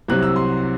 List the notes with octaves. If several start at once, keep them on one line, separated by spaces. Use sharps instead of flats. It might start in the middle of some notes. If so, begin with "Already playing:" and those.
C2 C3 F#3 C4 F#6
E6
C6